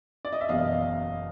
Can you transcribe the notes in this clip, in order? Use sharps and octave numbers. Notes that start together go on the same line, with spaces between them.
D5
D#5
E5
F#1 E2 B2 D#5 F5